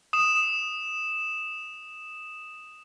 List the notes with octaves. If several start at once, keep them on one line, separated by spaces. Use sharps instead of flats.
D#6 E7